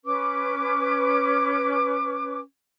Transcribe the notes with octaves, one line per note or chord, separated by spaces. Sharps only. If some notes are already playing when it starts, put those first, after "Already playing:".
C#4 B4 D6